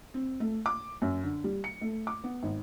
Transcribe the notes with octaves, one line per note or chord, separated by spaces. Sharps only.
C4
A3
D6
F#2
D3
G3
C#7
A3
D6
B3
G#1